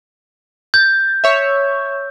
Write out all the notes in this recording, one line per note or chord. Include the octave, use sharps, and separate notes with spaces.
G6 A6
C#5 E5